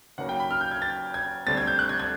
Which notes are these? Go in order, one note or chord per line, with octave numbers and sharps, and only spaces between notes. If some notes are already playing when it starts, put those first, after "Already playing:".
D#2 C#3 F#3 A#3 F#5
G5
B5
F6
G6
G#6
A6
G#6
D2 D3 G3 C4 A6
G#6
G6
F#6
G#6
G#6